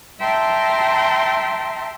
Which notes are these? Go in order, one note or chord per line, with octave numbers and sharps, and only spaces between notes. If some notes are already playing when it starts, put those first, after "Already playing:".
E5 G5 A5 A#5 C6